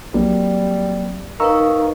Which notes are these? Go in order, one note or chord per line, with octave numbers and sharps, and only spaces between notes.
A#1 F#3 G3 A#3 C4
D#3 D#4 B4 F5 A#5 C#6 E6